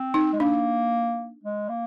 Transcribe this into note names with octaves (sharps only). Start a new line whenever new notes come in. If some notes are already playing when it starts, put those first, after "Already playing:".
Already playing: C4
D#4
G#3
A#3 D4
G#3
A#3